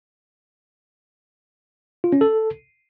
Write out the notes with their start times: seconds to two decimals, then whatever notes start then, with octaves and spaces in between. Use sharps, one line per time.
2.04 F4
2.13 C#4
2.21 A4